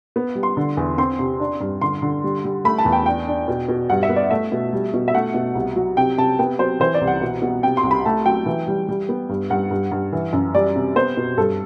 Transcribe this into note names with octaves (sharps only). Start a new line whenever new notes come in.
B3
G3
C6
D3
E2
C4 C6
C3
D4
G2
D3 C6
D3
G3
G3
A3 B5
A5
E2
G5
D4 G5
D4
B2
B2
G2 F#5
E5
B3
D5
A3 E5
B2
G3
B2
E5
A3 F#5
B2
C2
F#3
C3 G5
C3 A5
B3 G5
F#3 C5
E3 C5
D5
C2
F#5
B2
B2
C3 G5
C6
C2
B5
A3 A5
F#3 G5
E3
G3
G3
B3
G2
G2 F#5
G2
G2
E3
F#2
G3 D5
C3
B3 C5
B2
G2 A4